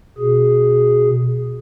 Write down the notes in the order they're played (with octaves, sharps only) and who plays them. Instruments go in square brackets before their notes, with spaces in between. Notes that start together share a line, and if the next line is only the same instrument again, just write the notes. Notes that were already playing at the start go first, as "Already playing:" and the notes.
[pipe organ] B2 G#4